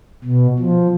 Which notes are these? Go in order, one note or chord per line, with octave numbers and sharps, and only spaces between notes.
B2
F3